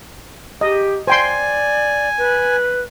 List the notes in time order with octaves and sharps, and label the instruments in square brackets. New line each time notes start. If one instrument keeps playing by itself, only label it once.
[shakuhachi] G4 [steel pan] D#5
[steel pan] C5 G5 C6 [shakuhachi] D5 [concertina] G#5
[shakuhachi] B4